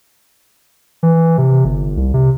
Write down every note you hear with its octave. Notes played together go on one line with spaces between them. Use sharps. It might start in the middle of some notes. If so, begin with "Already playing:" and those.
E3
C3
G1
C2
C3